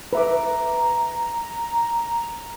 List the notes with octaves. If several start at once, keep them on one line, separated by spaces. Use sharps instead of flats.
B4 E5 A#5 D6